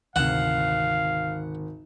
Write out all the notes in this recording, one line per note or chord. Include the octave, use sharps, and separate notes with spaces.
G#1 D2 C3 F5 F#5 E7